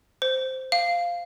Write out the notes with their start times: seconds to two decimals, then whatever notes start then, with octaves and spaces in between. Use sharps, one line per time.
0.22 C5
0.72 F5